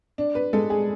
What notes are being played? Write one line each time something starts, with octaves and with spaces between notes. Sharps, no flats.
D4
B4
G#3 A4
G#4